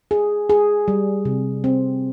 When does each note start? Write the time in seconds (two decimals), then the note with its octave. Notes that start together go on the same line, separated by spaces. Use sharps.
0.11 G#4
0.50 G#4
0.88 G3
1.25 C3
1.64 C4